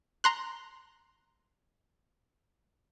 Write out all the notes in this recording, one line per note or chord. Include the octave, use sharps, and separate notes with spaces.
A#5 C6 F#6